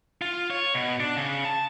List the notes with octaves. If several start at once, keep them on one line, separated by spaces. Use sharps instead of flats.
F4
C#5
B2
D4
C#3
A5